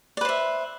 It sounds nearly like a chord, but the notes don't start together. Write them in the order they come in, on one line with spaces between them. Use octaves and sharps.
D5 B4 C5 E5